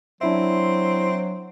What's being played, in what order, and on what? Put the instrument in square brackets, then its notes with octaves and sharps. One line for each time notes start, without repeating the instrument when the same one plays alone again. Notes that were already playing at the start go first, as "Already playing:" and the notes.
[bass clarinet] F#3 [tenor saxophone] C4 [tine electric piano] D4 E4 E5